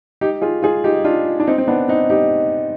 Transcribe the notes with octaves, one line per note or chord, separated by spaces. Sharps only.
D#4 G4
F4 G#4
F4 G#4
D#4 G4
D4 F4
D4
C4 D#4
C4
B3 D4
C4 D#4
D#4 G4